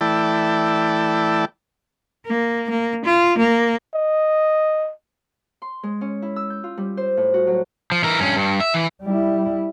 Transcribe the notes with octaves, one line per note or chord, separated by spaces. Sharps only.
E3 A3 E4 D5 G5 A5
A#3
A#3
F4
A#3
D#5
C6
G#3
C#4
E4
E6
G6
F4
G3
C5
A2
F#4
F#3
F3
E3 A#4
G2 C#4
G2
E5
E3
G3 E4